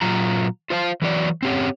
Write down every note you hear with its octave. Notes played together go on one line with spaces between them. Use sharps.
A#2 F#3 F4 A#5
F4 C5 F5 A5
E3 F#3 F#4 D5
C4 C#4 G4 C#5 F#5